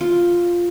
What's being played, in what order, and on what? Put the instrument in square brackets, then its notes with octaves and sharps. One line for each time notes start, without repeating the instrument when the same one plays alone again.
[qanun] F4